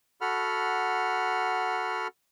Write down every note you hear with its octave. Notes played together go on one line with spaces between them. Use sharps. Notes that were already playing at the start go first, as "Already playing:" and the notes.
F#4 A4 F#5 B5 F6